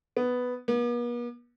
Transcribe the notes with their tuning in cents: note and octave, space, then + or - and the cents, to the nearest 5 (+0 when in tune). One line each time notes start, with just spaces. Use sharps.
B3 +5
B3 -45